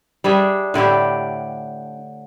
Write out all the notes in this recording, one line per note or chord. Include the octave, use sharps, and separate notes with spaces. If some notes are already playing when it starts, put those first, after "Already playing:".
G3 D4 G#4 E5
A2 D3 E4 G4